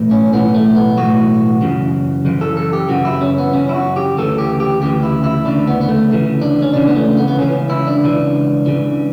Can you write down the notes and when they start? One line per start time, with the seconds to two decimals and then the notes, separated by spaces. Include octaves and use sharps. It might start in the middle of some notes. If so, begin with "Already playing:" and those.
Already playing: B1 A2 E3
0.11 C#4
0.33 B1 A2 E3 B3
0.54 A3
0.75 B3
0.97 B1 A2 E3 F#4
1.62 F#2 C#3 E3
2.25 F#2 C#3 E3
2.41 A4
2.57 A4
2.73 G4
2.89 F#2 C#3 E3 F#4
3.05 E4
3.21 C#4
3.38 B3
3.53 F#2 C#3 E3 C#4
3.69 E4
3.75 F#4
3.96 G4
4.17 D2 C#3 E3 A4
4.38 G4
4.60 G4
4.81 D2 C#3 E3 G4
5.03 E4
5.24 E4
5.45 D2 C#3 E3 D4
5.67 B3
5.81 B3
5.89 A3
6.09 D2 C#3 E3
6.42 D4
6.62 C#4
6.73 C#2 C#3 E3 D4
6.87 B3
6.96 A3
7.17 B3
7.28 B3
7.39 C#2 C#3 E3 C#4
7.70 E4
7.87 D4
8.03 C#2 C#3 E3
8.66 C#2 C#3 E3